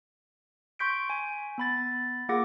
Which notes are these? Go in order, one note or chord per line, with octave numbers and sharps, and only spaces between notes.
C6 C#6 G6 B6 D7
G#5
B3 B5 A6
A#3 F4 G#4 F#5 D6 A#6